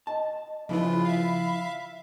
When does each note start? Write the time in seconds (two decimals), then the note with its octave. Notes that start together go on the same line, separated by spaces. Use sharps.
0.07 D#5 A5
0.69 C#3 F3 E4 F4 B4 B5
1.05 E5 F5